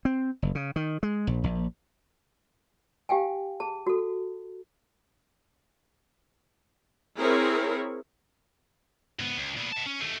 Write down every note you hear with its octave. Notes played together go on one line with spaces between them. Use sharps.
C4
F#1
C#3
D#3
G#3
A#1
A#1
G4 F5 G5 G#5
G#4 A5
F#4 A4
C4 E4 G#4 A#4 C#5
G#2 B3
C#2
A#2 B3
B3 A5
C#4
D#2 A3